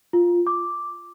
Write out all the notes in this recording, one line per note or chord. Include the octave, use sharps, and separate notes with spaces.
F4
D6